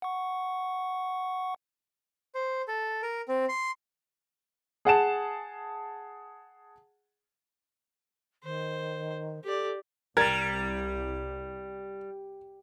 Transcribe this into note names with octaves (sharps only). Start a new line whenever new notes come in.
F#5 C#6
C5
A4
A#4
C4
C6
G#4 F#5 A5 E7
D#3 C5
G4 A4 D5
C2 G3 A#4 G#6 A6